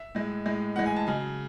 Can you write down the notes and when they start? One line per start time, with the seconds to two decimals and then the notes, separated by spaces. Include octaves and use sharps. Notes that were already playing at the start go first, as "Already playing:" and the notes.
Already playing: E5
0.15 A2 G#3
0.46 A2 G#3
0.76 A2 E3 G#3 F#5
0.86 G#5
0.96 A5
1.07 C#3 F#3 G#5